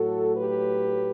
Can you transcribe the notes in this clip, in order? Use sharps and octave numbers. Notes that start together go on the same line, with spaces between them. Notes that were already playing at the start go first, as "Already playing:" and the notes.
Already playing: A2 F#3 A3 F#4 A4
G4 B4